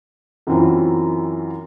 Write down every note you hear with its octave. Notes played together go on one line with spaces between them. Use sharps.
F#2 E3 F#3 C4 E4 F4